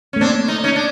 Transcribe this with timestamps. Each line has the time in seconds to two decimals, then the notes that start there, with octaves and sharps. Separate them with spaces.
0.13 C#4
0.16 A3
0.21 A#3 C4 D4
0.48 D#4
0.64 C#4 D#4
0.76 D4